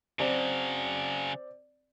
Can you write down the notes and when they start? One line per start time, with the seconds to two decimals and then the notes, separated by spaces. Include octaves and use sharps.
0.19 C#3 F#3 C4 D5